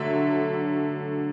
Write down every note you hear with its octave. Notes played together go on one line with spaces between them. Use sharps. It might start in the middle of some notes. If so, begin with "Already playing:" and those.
Already playing: D3 F#3 A3 E5